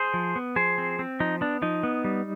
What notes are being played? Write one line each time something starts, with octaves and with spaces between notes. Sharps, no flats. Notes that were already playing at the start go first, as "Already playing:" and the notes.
Already playing: G#4 C5
F3
B3
F3 G#4 C5
C4
C4
F3 D#4
B3 D4
F3 D#4
B3
G3